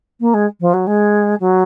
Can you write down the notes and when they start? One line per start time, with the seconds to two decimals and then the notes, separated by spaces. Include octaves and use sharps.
0.20 A#3
0.34 G#3
0.61 F3
0.74 F#3
0.87 G#3
1.40 F#3